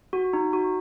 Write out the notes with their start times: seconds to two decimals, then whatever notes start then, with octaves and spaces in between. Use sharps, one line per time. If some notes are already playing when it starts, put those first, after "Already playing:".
0.13 F#4
0.33 D#4
0.53 F#4